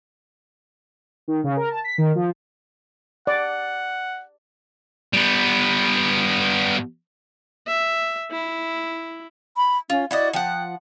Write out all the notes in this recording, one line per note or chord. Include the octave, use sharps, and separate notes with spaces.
D#3
C#3
A#4
A5
B6
D#3
F3
D5 F#5
G3 B3
E5
E4
B5
C#4 F4
E4 F#4 D5 D#5
F3 F#5 G5